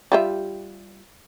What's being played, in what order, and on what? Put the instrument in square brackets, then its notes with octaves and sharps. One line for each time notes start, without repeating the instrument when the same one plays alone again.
[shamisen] G3 F4 E5